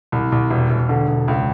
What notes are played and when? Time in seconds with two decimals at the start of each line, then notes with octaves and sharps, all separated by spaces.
0.12 C2
0.32 C2
0.50 E1
0.69 E1
0.89 D3
1.08 E1
1.28 C#2